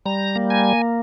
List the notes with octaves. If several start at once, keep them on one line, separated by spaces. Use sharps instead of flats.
G3 A#5
A#3
G#5